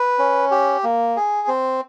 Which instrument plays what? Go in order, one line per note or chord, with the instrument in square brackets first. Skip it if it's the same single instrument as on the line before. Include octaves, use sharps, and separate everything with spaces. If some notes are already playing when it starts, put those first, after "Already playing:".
Already playing: [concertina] B4
C#4
G4
A#3
G#4
C4